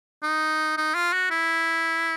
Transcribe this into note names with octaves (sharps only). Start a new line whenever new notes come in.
D#4
D#4
F4
F#4
E4